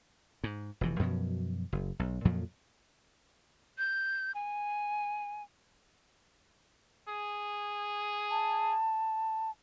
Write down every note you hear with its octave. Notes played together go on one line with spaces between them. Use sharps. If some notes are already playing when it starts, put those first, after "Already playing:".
G#2
F1 B2 E3
F#2 B2 F3 F#3
F#1
B1
F2 A#2 F3 F#3
G6
G#5
G#4
A5